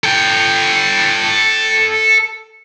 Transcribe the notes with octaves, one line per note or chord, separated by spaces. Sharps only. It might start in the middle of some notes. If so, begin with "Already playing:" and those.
A4 G5